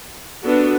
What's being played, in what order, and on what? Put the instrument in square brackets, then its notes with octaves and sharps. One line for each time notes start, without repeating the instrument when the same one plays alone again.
[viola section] B3 D4 F#4 A4